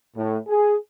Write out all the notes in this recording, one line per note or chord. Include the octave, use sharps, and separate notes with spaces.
A2
G#4